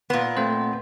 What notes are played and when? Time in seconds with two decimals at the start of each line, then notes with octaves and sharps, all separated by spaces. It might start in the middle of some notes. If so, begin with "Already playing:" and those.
0.10 A#2 B3
0.37 A3 C4 C5